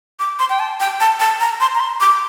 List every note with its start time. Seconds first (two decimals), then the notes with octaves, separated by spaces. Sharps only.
0.19 D6
0.39 C6
0.50 G5
0.60 A5
0.80 G5
1.00 A5
1.20 A5
1.40 A#5
1.61 C6
1.75 A#5
1.80 C6
2.00 D6